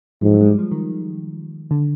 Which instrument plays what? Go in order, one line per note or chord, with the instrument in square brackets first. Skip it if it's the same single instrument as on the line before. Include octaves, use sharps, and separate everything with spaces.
[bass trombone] G#2 [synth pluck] F3
[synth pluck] F#3
G#3
G3
F3
D#3
D3